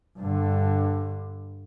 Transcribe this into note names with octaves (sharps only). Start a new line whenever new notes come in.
G2 D3